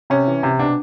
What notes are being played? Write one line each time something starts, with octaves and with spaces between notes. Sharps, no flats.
C3 C#4
E3
C3
B2 D4